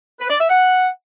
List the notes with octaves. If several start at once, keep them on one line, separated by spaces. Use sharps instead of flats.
B4
D5
E5
F#5